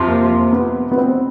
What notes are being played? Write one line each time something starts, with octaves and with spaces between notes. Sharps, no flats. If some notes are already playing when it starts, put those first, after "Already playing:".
Already playing: F2 C3 F3
A#3
B3
B3
C4